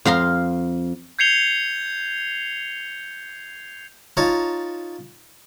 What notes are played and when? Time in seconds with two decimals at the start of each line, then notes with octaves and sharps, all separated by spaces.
0.05 F2 F5 A#5 C6
1.19 G6 G#6 C7 C#7 F7 G7
4.17 D#4 F4 C#5 A5 A#5